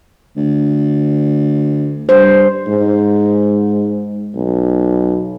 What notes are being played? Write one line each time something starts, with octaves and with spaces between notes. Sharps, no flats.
D2
G2 C5
G#2
B1